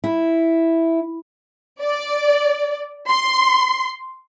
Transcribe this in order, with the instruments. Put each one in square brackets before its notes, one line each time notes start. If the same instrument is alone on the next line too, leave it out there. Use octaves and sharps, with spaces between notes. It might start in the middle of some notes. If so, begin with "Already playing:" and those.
[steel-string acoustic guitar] E4
[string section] D5
C6